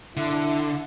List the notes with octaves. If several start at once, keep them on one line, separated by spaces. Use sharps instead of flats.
D3 E4